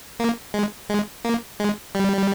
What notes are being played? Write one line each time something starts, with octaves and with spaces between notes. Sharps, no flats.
A#3
G#3
G#3
A#3
G#3
G3